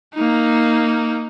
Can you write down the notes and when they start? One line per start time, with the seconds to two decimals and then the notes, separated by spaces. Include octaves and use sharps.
0.14 A#3 D#4